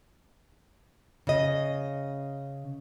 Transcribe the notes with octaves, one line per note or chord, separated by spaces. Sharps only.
C#3 D#5